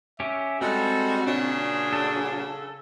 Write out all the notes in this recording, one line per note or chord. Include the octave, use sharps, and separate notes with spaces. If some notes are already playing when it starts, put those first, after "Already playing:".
C#4 G4 E5
G3 G#3 C4 F#4 A4 F#6
A#2 C#3 F#3 D4 G#4
A4